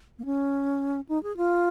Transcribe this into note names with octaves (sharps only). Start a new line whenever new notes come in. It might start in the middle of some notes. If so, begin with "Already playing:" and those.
A#3
C#4
D#4
G#4
F4